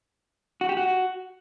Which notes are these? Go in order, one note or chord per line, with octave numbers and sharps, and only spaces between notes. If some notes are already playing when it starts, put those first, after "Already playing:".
F#4
G4
F#4